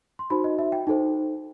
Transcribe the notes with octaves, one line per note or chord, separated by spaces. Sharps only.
C6
D#4 F#4 C5 B5
D#5
E5
G5
D#4 A4 C5